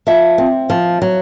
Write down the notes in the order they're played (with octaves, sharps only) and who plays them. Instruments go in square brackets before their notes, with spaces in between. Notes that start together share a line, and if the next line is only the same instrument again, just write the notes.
[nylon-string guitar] F3 [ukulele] E5
[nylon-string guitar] C4
F3
F#3